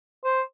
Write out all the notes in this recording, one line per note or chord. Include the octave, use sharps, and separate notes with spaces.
C5